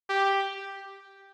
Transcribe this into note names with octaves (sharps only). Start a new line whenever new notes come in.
G4